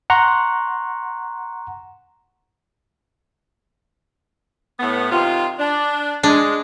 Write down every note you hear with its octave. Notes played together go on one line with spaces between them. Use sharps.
F#5 A#5 C6 C#6
A2 B3
C3 D#3 F4
D4
G#3 D4